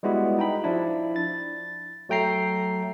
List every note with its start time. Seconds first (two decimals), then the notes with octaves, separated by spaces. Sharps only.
0.03 G3 G#3 B3 E4 F#4
0.39 D#4 G5 B5
0.64 F3 D4 E4
1.16 A6
2.09 F#3 A3 G5 A#5 C7